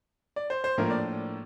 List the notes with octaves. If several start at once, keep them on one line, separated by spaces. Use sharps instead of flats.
D5
C5
C5
A2 F3 A#3 D4 A#4
D5